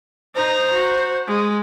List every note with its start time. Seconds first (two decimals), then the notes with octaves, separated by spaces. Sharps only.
0.35 D#4 C5 A#5
0.72 F#4
1.27 G#3